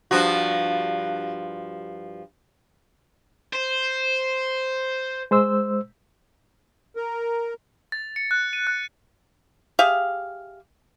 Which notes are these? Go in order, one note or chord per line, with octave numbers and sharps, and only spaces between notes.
G2 F3 F#4
C5
G#3 C5 E6
A#4
A6
C#7
F#6
D#7
F#6
G4 G#4 E5 F5